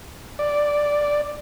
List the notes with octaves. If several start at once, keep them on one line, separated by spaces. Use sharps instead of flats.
D5